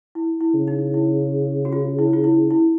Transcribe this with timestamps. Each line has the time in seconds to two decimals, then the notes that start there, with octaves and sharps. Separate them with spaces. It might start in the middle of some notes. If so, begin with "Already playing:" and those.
0.15 E4
0.40 E4
0.54 C#3
0.67 D#4
0.94 E4
1.65 F#4
1.72 F4
1.99 E4
2.13 F4
2.24 E4
2.50 E4